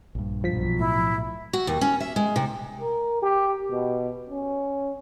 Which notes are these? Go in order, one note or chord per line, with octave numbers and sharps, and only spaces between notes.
A#1 G2
B1 F3 B6
A2 E4
F#4
D#2
C#4
E5
G#3
C3
A#4
G4
B2
C#4